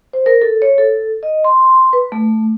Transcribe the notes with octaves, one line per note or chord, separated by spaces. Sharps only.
C5
A#4
A4
C#5
A4
D#5
C6
B4
A3